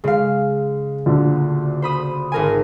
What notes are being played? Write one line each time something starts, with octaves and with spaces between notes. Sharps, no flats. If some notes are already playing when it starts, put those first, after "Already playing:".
C#3 G#3 F5
D2 A#2 D3
C5 B5 D#6
G#1 A#4 G#5